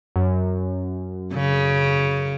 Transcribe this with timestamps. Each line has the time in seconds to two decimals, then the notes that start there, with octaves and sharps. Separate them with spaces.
0.16 F#2
1.35 C#3